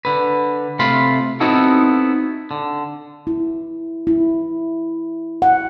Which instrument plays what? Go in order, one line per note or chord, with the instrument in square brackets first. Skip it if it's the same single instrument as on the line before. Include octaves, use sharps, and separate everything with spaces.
[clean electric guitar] D3 B4
C3 A3 F4 B5 C6
B3 C4 D#4 E4 F#4 A4
D3
[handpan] E4
E4
F#5